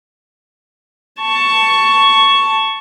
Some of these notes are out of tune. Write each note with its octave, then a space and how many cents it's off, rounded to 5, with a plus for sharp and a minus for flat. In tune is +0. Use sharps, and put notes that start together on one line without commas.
A5 +10 C#6 +5